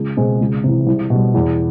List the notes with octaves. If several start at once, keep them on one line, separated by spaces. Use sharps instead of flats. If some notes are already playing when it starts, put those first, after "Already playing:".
Already playing: C#2
B2 G#3 C4
C#2
C3 E3
C2
B2 G3
E2